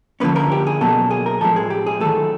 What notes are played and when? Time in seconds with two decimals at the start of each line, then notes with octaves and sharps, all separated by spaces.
0.20 D3 F3 A#3 C#4 B4
0.36 A#4
0.52 G4
0.67 G#4
0.81 B2 F#3 A#3 A4
1.11 G#4
1.26 A#4
1.41 A2 F3 G#3 C4 A4
1.56 G#4
1.70 G4
1.86 G#4
2.01 D#3 F#3 A3 A4